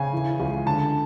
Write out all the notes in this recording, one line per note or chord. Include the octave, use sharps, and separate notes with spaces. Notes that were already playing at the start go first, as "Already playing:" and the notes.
Already playing: C#3 G#5
E3
C#2
D3 A5